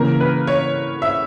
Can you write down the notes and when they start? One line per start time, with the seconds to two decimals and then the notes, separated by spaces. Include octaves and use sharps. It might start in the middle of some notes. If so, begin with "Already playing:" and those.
Already playing: C#3 E3 A#3 A#4
0.20 B4
0.47 C#5
1.02 E5